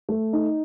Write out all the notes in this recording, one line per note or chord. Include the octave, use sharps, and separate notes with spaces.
A3
D#4